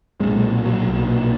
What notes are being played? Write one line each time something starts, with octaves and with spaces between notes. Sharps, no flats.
B1 A#2 G#3
F#3
B1 A#2